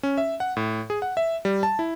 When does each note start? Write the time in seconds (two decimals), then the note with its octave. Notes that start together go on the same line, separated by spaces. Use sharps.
0.03 C#4
0.18 E5
0.40 F#5
0.57 A2
0.90 G#4
1.02 F#5
1.17 E5
1.45 G3
1.63 A5
1.79 E4